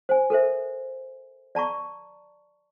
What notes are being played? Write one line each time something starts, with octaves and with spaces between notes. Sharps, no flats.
C5 G#5
A4 A#4 C5 E5
D5 A5 A#5 C#6